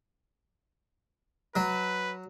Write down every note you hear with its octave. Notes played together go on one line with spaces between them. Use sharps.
F#3 B4